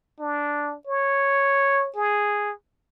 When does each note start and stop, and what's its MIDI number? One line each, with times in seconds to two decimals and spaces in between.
0.20 0.75 62
0.87 1.89 73
1.96 2.52 68